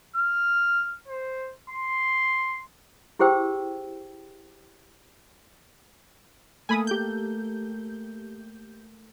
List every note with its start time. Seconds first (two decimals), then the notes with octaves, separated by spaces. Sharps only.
0.16 F6
1.08 C5
1.70 C6
3.19 E4 G4 G#4 C5 G5 E6
6.69 A3 A#3 A4 G#5 B5 D#6
6.87 G4 G6